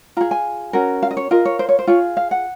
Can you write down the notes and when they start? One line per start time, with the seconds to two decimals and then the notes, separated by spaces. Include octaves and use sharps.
0.17 F4 G#4 A#5
0.31 G#5
0.73 C#4 F#4 A#4
1.03 F5
1.11 D#5
1.17 C#5
1.31 F4 A#4 D#5
1.45 C#5
1.59 C5
1.69 C#5
1.79 C5
1.87 F4 G#4 C#5
2.17 F5
2.31 F#5